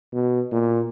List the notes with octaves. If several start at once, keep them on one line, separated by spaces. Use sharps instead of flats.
B2
A#2